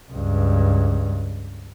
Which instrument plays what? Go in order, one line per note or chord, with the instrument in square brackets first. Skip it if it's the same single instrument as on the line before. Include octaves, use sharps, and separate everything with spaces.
[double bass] C#2 G2